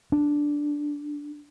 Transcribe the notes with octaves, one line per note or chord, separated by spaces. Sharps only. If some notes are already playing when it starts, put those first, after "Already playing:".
D4